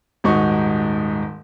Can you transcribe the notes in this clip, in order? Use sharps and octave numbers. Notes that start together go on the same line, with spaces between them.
D#1 G#2 D#4 F#4 C#6